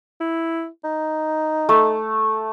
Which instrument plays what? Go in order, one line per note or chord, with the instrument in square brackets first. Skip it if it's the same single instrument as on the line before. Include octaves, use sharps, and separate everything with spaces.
[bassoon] E4
D#4
[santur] A3